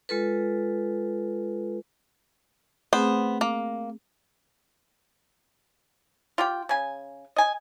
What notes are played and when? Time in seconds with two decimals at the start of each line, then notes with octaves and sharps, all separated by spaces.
0.09 G#3 F4 A4 B4
2.93 A3 B3 C4 G#4 C5
3.41 A#3
6.38 F4 G4 G5
6.69 C#3 G#5
7.36 D#5 G#5